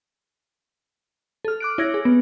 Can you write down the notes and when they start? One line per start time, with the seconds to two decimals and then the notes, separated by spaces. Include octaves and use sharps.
1.45 A4 F6
1.60 D6 F#6 D7
1.78 E4 C#5 G#6 A#6
1.94 G#4
2.05 B3